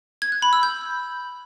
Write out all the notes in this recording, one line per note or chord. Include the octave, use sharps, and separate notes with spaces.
G#6
F#6
B5
E6
G6